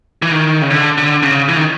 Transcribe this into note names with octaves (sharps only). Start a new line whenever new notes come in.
E3
D#3
C#3
D3
D3
C#3
E3
D#3